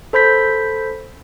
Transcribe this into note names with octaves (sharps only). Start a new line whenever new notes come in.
A4 C5 B5 G6 B6